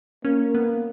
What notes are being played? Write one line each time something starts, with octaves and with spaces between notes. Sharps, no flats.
A#3 C#4
B3